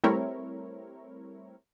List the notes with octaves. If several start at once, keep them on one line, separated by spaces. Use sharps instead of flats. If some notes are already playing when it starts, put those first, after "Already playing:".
G3 A3 C4 E4 A#4 C#5